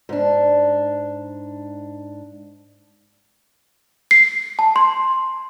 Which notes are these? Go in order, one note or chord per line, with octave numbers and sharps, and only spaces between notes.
G#2 D4
C7
A5
C6